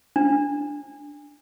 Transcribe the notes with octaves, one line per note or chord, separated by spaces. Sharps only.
D4